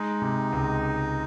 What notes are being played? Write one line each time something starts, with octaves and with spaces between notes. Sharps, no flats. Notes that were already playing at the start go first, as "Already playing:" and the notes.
Already playing: G#3 D#4
C3
C#2